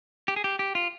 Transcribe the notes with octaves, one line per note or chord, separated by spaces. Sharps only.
G4
G#4
G4
G4
F4